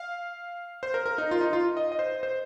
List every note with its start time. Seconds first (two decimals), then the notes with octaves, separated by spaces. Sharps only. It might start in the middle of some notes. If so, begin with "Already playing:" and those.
Already playing: F5
0.83 C5
0.94 A#4
1.06 A#4
1.18 D#4
1.31 F4
1.41 D#4
1.53 F4
1.77 D#5
1.92 D#5
1.99 C5
2.23 C5